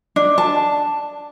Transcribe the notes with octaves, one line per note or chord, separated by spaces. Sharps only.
D4
A5